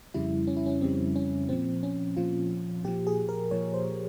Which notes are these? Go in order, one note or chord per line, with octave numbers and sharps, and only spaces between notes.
F2 C#3 G3 E4
C#4
E4
C#4
F2 C#3 G3 C4
C#4
A#2 F3 C4
C#4
A#2 F3 F4
A#2 F3 G4
G#4
A#4
A#2 F3 C#5
C5